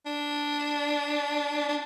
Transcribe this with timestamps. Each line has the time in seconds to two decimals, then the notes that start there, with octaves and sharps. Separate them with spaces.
0.06 D4
1.68 D4